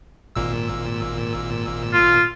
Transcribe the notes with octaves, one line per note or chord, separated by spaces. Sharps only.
G#1 A#2 E6
F4